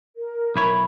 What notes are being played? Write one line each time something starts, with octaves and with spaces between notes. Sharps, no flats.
A#4
B1 E4 C#5 B5